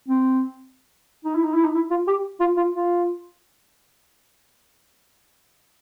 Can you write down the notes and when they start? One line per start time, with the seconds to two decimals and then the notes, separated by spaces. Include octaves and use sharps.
0.08 C4
1.25 D#4
1.35 E4
1.44 D#4
1.54 E4
1.64 D#4
1.74 E4
1.90 F4
2.07 G4
2.40 F4
2.57 F4
2.73 F4